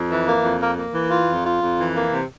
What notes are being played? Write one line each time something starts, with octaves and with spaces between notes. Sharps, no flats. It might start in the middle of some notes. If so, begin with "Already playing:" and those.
Already playing: F2
E3
A#3
F2
A#3
A#3
E3
F4
F2
F4
F2
E3
A#3
C3